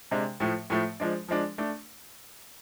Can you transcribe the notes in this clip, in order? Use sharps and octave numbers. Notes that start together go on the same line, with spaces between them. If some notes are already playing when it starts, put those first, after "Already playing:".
C3 G#3 D4
A2 F3 A3
A2 F3 A3
F3 G#3 D4
F3 G#3 D4
A3 D4